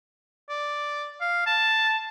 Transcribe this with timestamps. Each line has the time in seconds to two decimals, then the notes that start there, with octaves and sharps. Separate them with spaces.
0.49 D5
1.21 F5
1.46 A5